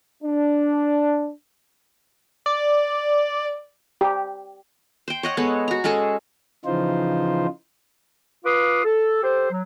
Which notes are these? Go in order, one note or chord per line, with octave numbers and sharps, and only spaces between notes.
D4
D5
G4
C5 G5
C#5 D#5 F#5
G#3 B3 A4 C#5
F#4 A#5
G#3 C#4 G#4 A4
C#3 E3 F3 D#4 F4 C5
F4 B4 F5 D6 D#6
A4
G4 A4 C5
F#3